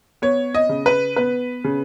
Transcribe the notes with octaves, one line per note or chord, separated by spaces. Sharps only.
B3 C#5
D#5
C#3
B4
B3 B4
C#3